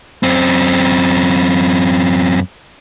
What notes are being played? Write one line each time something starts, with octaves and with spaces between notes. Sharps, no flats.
F#2 C4